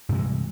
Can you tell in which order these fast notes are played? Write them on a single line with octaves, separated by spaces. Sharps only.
G2 C3 G#3 E3